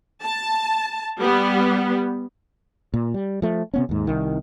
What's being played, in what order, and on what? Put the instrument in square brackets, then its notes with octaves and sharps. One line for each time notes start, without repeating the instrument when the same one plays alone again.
[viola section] A5
G3 B3
[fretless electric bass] A#2
G3
F3 A3
C3 B3 C#4
D#2 G#2
C2 D#3